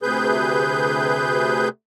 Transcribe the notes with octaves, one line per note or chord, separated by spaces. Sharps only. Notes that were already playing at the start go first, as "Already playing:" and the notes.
D2 C3 G#4 B4 G6